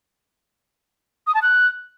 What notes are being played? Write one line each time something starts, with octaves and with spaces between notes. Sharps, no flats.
D#6
A5
F#6